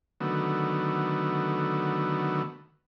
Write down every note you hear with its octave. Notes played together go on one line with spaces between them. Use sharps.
D3 D#3 F#3 A3 B3